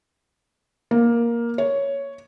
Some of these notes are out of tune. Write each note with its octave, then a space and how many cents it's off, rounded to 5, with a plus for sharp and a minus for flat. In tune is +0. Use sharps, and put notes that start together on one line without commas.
A#3 +10
C#5 +5